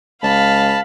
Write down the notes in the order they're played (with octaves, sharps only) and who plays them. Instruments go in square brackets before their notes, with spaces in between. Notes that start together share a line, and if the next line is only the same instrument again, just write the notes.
[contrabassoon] C#2 [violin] F5 B5 [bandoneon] A5